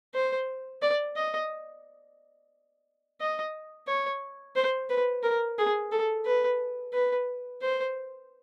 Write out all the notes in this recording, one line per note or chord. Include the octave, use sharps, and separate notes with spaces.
C5
D5
D#5
D#5
C#5
C5
B4
A#4
G#4
A4
B4
B4
C5